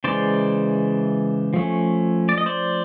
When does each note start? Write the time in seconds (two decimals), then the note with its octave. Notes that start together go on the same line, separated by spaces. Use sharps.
0.04 C#3 E3 G#3 C5 D5
1.54 F3 A3 C#4
2.29 D5
2.38 D#5
2.46 C5 D5